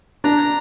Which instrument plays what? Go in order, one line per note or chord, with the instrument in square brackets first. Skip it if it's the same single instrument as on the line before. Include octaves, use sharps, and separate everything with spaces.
[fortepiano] D4 [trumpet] A#5